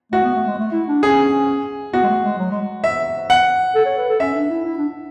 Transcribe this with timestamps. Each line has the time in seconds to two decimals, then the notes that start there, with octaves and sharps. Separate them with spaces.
0.12 A3 F#4
0.23 B3
0.35 A3
0.47 G#3
0.57 A3
0.72 E4
0.88 D4
1.03 C#4 G#4
1.93 B3 F#4
2.03 G#3
2.09 A3
2.24 G#3
2.38 F#3
2.51 G#3
2.61 G#3
2.84 E5
3.30 F#5
3.75 A4
3.85 C#5
3.97 B4
4.09 A4
4.20 C#4 E5
4.35 D4
4.49 E4
4.65 E4
4.77 D4